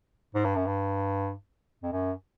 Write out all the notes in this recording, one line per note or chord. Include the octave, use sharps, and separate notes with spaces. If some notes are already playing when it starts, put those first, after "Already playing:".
G#2
G2
F#2
G2
F2
F#2